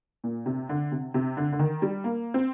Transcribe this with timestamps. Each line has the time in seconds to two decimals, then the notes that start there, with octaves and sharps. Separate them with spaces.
0.24 A#2
0.46 C3
0.69 D3
0.92 C3
1.14 C3
1.37 D3
1.52 D3
1.59 D#3
1.82 G3
2.04 A#3
2.34 C4